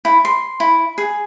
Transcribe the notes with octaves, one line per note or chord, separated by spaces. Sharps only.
E4
C6
E4
G#4